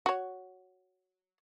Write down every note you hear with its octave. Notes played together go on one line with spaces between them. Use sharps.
F#4 C#5